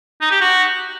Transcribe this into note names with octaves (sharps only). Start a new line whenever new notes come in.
D#4
G4
F#4